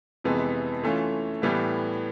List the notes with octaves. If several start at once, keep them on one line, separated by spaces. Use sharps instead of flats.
F2 C3 E3 G#3 B3
E3 A3 C#4 F4
A2 E3 G3 B3 E4